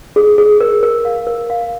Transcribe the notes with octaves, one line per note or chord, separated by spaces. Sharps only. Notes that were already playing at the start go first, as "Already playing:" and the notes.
G#4
G#4
A#4
A#4
F5
A#4
F5